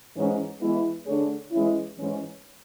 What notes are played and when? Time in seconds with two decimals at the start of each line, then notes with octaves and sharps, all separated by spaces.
0.16 G#2 E3 G#3 C#4
0.61 E3 G#3 B3 E4
1.06 D3 A3 D4 G#4 C#5
1.52 E3 G#3 C#4 E4
1.98 G#2 E3 G#3 C#4